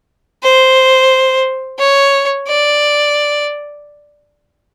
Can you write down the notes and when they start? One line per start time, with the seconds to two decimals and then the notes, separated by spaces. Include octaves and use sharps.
0.43 C5
1.79 C#5
2.48 D5